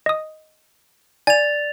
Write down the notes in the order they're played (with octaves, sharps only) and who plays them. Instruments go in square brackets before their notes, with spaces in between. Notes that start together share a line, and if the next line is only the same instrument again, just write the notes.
[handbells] D#5 D#6
[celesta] D5 [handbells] G#5 [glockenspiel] A6 F7